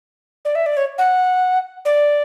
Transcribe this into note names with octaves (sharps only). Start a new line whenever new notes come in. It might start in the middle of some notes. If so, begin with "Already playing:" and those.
D5
E5
D5
C#5
F#5
D5